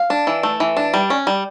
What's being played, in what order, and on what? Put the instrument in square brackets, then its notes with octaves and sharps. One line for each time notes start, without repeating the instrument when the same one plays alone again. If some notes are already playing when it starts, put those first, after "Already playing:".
Already playing: [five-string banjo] F5
D4
E3
A3
E3
D4
G3
C#4
G3